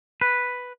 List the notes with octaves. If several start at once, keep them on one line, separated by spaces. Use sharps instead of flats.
B4